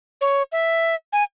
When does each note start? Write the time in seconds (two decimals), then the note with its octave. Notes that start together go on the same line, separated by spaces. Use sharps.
0.21 C#5
0.52 E5
1.13 G#5